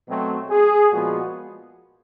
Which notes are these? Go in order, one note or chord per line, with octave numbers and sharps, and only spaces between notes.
B2 F#3 A3 C4
G#4
A#2 F3 G#3 B3 F#4